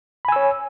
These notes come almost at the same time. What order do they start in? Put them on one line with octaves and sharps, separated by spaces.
B5 G#5 E6 C#5